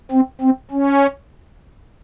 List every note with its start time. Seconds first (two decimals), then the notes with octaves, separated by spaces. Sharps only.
0.12 C4
0.41 C4
0.71 C#4